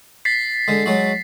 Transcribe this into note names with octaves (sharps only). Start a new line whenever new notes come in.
A6 B6 C7
D3 G#3
F#3 G#3 F#4